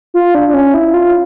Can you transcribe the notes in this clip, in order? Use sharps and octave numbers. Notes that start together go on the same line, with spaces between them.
F4
D4
D4
C#4
E4
F4